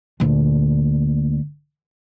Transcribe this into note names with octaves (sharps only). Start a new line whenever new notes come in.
D2 A#2